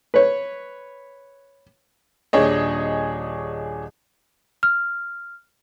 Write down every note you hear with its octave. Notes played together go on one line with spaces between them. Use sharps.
B4 C#5
D#1 D4 G#4 C#5 D#5
F6